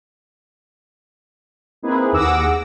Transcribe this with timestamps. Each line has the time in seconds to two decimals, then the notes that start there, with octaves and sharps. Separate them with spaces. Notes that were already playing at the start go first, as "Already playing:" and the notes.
1.82 A#3 C4 D#4 E4 G#4 B4
2.12 D#2 G#4 F#5 D6 E6 A#6